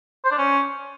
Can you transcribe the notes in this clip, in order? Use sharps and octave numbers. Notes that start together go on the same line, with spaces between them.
C5
D4
C#4